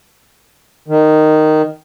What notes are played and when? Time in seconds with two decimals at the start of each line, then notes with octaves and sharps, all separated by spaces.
0.88 D#3